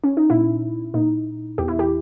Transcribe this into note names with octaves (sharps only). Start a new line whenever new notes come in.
C#4
D#4
A#2 E4
A#2 D#4
E2 G4
E4
G4